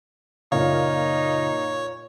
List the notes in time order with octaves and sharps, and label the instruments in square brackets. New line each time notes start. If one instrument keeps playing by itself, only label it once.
[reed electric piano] F#2 C#3 [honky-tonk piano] A#2 F4 [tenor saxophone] D#4 [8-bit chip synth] C#5